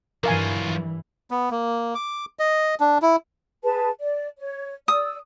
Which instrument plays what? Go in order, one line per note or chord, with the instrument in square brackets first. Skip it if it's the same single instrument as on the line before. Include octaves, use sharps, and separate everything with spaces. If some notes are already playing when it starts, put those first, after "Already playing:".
[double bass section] G2 E3 [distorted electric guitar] F#3 F4 [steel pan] A#4 F5 G#5
[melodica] B3
A#3
D6
D#5
D4
E4
[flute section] G#4 B4 A5
D5
C#5
[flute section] D5 E6 [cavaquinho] D#6